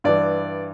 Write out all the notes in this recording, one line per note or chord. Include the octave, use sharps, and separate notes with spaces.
G2 E3 D5